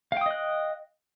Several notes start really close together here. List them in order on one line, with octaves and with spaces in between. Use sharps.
F5 G5 D#6 D#5 F#6